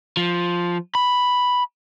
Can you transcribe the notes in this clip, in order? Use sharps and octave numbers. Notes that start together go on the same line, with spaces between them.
F3
B5